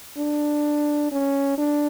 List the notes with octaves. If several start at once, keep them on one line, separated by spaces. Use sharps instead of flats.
D4
C#4
D4